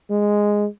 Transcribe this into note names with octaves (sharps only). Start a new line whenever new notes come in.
G#3